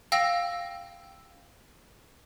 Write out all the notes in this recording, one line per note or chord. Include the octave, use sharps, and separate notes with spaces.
F5 G5 E6 A#6